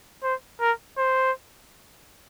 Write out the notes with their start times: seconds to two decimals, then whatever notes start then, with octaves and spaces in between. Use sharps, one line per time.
0.23 C5
0.61 A#4
0.98 C5